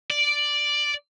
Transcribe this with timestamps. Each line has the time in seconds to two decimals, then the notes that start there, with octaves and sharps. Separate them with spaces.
0.10 D5